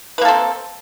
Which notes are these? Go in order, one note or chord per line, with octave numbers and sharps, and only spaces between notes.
A#3 C4 A4 B4